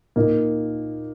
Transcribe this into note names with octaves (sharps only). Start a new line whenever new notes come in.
A#2 A#3 D#4